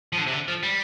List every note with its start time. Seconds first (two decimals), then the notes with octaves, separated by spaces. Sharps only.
0.13 F3
0.18 D3
0.27 C3
0.33 D3
0.48 F3
0.63 G3